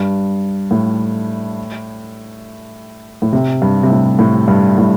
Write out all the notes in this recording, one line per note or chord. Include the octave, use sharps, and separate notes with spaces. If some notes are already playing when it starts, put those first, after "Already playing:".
Already playing: G2
A2
A2
C3
G2
C3
A2
A2
G2
A2